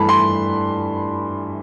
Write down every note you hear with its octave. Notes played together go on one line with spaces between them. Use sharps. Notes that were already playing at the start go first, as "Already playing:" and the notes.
Already playing: G2 E3 A3 A5 B5
C6